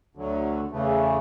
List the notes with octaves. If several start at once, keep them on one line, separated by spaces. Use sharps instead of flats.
D2 D3 F#3
E2 C#3 E3 A3